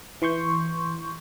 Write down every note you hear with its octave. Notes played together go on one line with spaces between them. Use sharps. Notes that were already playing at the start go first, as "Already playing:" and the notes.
E3 C6 C#6 G6